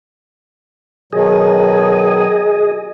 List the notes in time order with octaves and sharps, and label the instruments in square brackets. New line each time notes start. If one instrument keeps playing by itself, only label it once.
[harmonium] B2 D#3 F#3 [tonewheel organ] G#4 D#5